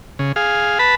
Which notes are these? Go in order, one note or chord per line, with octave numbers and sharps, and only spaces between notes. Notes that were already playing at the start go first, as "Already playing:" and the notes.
C#3
G#4 F5
B4 A5 B5